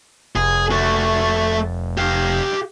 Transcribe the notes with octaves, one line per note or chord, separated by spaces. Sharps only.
F1 G#4
A3 F#4
G4 F5